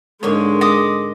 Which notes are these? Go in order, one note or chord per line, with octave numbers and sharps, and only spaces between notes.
G#2 D3 G#3 A#3 C#5
D#5 D6 D#6